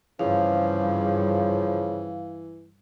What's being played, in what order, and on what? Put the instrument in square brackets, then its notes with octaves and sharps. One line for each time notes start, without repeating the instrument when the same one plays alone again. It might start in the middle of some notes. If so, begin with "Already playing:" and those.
[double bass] G2 [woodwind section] C#3 F3 [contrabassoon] E3 [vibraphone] F5